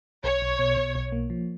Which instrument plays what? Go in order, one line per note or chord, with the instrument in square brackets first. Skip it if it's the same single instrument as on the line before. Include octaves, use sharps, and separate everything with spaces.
[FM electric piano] B1 [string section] C#5
[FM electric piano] B1
B2
B2
B1
A#3
F3